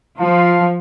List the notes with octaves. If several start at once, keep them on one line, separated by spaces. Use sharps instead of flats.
F3 F5 A5 C6